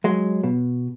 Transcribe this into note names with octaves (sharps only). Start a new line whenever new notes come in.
F#3 G#3
B2